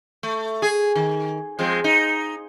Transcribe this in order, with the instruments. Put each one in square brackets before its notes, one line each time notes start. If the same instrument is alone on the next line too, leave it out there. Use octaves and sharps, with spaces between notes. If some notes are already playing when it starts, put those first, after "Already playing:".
[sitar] A3
G#4
D#3
F3 G#3 C4
D#4